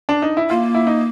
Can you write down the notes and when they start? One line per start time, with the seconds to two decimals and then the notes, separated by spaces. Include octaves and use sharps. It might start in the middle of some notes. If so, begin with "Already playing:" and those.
0.09 D4
0.22 D#4
0.37 E4
0.50 A#3 F4
0.75 E4
0.87 D#4